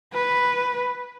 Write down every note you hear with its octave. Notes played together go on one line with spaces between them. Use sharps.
B4